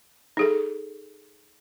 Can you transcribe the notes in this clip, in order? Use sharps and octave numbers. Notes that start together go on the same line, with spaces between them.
D#4 G#4 A4